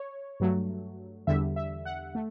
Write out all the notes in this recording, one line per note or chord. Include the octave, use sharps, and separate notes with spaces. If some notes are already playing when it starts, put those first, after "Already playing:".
Already playing: C#5
G2 F#3 A3
E2 D3 G3 E5
E5
F#5
A3